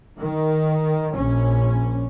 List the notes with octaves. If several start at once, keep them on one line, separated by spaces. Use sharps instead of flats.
D#3
A#1 C#4